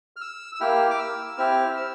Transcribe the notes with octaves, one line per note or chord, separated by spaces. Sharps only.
F6
E6
E6
A#3 E4 G4 F6
D6
E6
C4 E4 G4 F6
E6